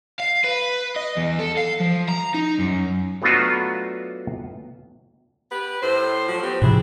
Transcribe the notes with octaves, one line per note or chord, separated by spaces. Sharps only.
F5
B4
D#5
E2
A4
F5
F3
A#5
D#4
F#2
F#3 A3 B3 D4 F4 F#4
G4 B4
A2 C5
F3 F#3
B3 C4 G4
A2 C3 F3 D4 E4 G#4